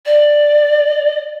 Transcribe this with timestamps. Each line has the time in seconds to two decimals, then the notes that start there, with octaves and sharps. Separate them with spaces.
0.06 D5